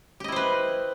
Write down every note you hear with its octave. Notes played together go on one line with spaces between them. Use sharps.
E4 G4 B4 C5 D#5